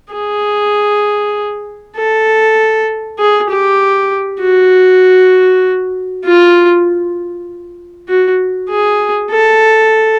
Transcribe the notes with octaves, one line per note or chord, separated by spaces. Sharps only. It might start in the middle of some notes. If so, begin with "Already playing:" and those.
G#4
A4
G#4
G4
F#4
F4
F#4
G#4
A4